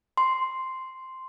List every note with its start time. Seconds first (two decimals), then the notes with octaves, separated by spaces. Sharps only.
0.17 C6